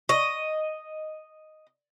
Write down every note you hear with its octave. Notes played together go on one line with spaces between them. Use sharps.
D#5 C#6